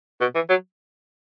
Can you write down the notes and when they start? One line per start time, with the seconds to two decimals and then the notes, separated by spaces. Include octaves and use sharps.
0.21 B2
0.35 E3
0.49 F#3